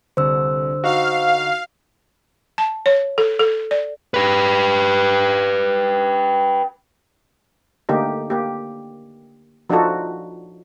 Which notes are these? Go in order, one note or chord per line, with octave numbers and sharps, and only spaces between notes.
C2 D3 C5 E6
D#4 F#4 F5
A5
C#5
A4
A4
D5
G4 B4
D3 A3 A#3 D#4 G4
A#3 G4
F3 D4 D#4 F4 F#4 A4